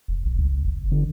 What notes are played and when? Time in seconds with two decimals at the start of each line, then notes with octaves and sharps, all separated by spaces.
0.08 F1
0.25 A#1
0.38 C#2
0.65 F#1
0.92 D3